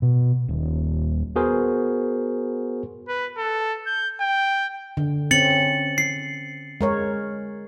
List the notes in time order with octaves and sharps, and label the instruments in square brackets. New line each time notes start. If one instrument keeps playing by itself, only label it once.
[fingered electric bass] B2
D#1
[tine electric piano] B3 F#4 G#4 A#4 C5
[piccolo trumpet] B4
A4
G6
G5
[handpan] D3
[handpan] C4 C#4 [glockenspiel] A6 C#7 F#7
[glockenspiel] C7
[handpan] G#3 A#4 C#5